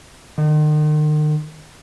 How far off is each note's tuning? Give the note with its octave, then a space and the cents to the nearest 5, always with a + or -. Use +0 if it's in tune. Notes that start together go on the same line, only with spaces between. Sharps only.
D#3 -40